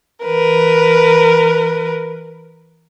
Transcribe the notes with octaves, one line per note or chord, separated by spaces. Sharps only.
E3 A#4 B4